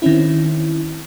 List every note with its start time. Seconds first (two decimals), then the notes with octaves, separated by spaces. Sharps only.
0.02 D#3 C4 C#4 E4